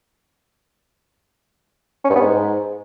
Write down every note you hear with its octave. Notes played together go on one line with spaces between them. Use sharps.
C#4
G2
B3
G#2